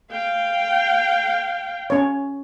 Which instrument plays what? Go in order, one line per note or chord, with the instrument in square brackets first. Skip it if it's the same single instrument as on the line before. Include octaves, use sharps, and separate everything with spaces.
[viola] F5 G5
[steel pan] C#4 C#5